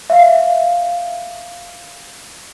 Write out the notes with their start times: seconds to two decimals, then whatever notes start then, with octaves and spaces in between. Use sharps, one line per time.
0.10 E5 F5